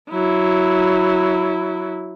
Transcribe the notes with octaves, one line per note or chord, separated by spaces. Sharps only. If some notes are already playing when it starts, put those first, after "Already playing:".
F#3 E4